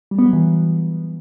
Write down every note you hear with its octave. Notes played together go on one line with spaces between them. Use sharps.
G3
B3
F#3
E3